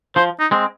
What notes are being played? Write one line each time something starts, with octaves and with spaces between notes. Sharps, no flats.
F3 C5
D#4
G#3 C4